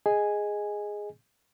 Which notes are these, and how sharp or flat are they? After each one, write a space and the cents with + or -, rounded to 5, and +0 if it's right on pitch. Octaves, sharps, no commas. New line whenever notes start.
G#4 +0 D#5 +0 G#5 -5